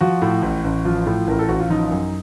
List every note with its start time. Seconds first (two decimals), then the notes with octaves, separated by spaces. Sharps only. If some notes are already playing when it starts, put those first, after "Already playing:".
0.01 F3 F#4
0.22 A2
0.43 A1
0.64 A1
0.85 F3 F4
1.06 A2
1.27 A1 A#4
1.39 A4
1.48 A1 F#4
1.60 F4
1.70 F3 D#4
1.91 F#2